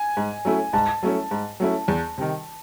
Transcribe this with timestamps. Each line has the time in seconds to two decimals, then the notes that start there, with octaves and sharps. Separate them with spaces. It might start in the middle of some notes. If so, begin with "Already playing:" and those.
Already playing: G#5
0.17 G#2
0.45 F#3 A3 C#4 E4
0.73 G#2 A5
1.03 F#3 A3 C#4 E4
1.31 G#2
1.60 F#3 A3 C#4 E4
1.88 E2
2.18 C3 D#3